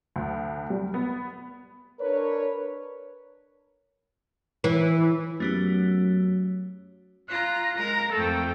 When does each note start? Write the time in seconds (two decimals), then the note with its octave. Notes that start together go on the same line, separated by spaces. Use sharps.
0.16 D2
0.70 G3
0.94 B3
2.00 D4 A#4 B4 C#5
4.64 E3
5.40 F#2 F#3 A3 B3 G4
7.29 F4 A#5 F#6
7.77 G#3 A#4 A#5
8.12 F2 A3 A4 G5